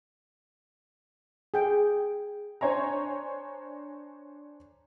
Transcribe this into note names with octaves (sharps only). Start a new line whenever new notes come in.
G#4 G5
D4 C5 C#5 G#5 A#5